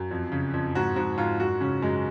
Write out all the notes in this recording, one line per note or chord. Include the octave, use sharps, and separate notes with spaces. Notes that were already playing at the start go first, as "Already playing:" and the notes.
Already playing: F#2
F2
C#3
F2
G#2 F#4
G#2 F#4
G#2 F4
F#2 F#4
C#3 C#4
F#2 G#3